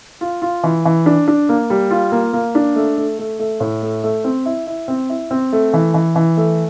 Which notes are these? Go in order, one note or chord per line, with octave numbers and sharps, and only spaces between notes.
F4
F4
E3
E3
D4
D4
A#3
G3
F4
A#3
A#3
D4
A3
A3
A3
A3
A2
A3
A3
C4
E4
E4
C4
E4
C4
A3
E3
E3
E3
A3